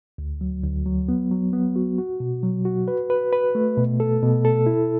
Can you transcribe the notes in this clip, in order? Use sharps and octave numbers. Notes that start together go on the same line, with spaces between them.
D2
F#3
D2
F#3
B3
F#3
B3
F#4
F#4
B2
F#3
F#4
B4
B4
B4
A3
B2
A4
B2
A4
E4